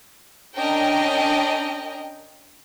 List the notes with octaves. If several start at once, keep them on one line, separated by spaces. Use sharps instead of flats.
C#4 D4 A#4 D#5 G5